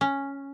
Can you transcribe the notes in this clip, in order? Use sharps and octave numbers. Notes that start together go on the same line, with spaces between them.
C#4